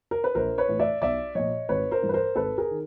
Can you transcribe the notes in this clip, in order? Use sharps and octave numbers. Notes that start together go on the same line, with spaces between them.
A#4
B4
A#1 A#4 C5
B4 C#5
A2 E3
D5 E5
B1 D5 E5
A#2 F3 C#5 D#5
G#1 B4 C#5
A#4 C5
G2 E3
B4
A#4 C5
G#1 A4 B4
G#4 A#4
D#3